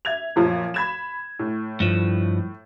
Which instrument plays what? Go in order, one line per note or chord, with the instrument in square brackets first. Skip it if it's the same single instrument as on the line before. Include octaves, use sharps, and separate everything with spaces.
[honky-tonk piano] E5 G#6 F7
F#2 A#2 F3
B5 G#6 E7
A2
[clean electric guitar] G2 F3